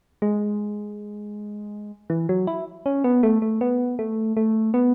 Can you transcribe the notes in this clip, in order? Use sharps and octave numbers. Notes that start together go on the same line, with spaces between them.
G#3
E3
F#3
E4
C#4
B3
A3
A3
B3
A3
A3
B3